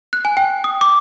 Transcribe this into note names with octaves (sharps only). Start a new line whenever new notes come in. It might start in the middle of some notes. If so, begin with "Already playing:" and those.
F#6
G#5
G5
D#6
D6